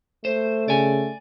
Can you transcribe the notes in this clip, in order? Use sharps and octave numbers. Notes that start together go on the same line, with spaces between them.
A3 C5
C#3 D5 G#5